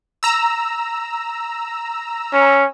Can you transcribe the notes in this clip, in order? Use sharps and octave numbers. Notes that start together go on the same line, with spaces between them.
A#5 E6
C#4